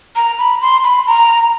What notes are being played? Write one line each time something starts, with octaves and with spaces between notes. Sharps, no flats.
A#5
B5
C6
B5
A#5